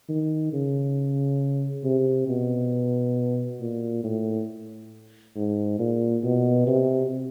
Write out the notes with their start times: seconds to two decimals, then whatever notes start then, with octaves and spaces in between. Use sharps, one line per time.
0.09 D#3
0.53 C#3
1.84 C3
2.28 B2
3.60 A#2
4.04 A2
5.36 G#2
5.79 A#2
6.24 B2
6.68 C3